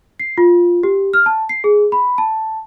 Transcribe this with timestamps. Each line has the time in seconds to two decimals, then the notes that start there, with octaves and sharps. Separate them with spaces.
0.20 C7
0.38 F4
0.83 G4
1.13 F6
1.26 A5
1.49 C7
1.64 G#4
1.92 B5
2.18 A5